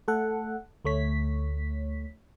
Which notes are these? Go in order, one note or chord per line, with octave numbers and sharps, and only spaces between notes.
A3 A4 F#5
D2 A3 C#5 B6